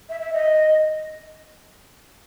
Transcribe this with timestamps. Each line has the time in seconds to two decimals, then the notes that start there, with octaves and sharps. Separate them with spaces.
0.09 E5
0.21 E5
0.33 D#5